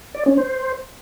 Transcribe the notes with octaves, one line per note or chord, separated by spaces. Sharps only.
D5
C#4
C5